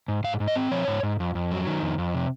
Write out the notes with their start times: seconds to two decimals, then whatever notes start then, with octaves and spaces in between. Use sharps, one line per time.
0.08 G#2
0.24 G#2 F5
0.40 G#2
0.48 D#5
0.56 C4
0.71 F3 C#5
0.88 G#2
1.03 G#2
1.20 F2
1.35 F2
1.51 F#3
1.67 D#3
1.82 F2
1.98 F2
2.15 C3